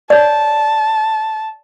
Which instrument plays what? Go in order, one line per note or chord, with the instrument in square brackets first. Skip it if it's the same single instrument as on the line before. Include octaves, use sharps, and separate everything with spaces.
[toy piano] C#5 D5 [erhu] A5